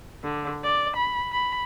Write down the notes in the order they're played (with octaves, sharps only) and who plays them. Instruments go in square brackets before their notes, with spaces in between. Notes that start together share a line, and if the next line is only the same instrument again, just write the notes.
[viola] D3
D5
B5
B5